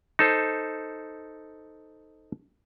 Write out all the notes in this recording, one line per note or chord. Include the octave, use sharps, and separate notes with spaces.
D#4 A4 C5